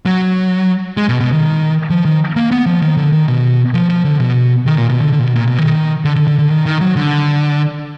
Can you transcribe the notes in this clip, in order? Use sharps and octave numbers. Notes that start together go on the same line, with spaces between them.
F#3
G#3
B2
B2
D#3
F3
D#3
A#3
B3
F3
D#3
D3
D#3
B2
F3
F3
D3
B2
D#3
A#2
B2
D3
D3
A#2
B2
A#2
B2
D#3
D3
D3
D3
D3
D#3
D#3
F#3
D3